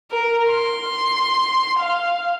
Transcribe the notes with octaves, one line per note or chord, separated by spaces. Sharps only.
A#4
C6
F5